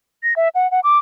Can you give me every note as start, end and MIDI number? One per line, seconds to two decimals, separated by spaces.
0.23 0.34 94
0.36 0.49 76
0.55 0.70 78
0.71 0.80 78
0.84 0.99 86